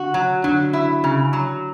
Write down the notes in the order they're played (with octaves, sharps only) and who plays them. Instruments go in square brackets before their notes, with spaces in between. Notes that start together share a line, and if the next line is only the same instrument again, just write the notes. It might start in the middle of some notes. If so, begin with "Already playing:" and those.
Already playing: [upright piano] D3 [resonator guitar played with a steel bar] F#4
[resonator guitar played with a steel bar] F#3
[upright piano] D3 [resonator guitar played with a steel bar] F#3
[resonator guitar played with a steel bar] E4
C#3
F#3